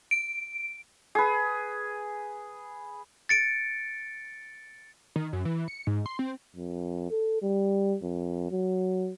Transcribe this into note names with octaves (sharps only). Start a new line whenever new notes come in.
D7
G#4 B4
A6 C#7 D7
D#3
F#2
E3
C#7
G#2
C6
C4
F2
A4
G3
F2
F#3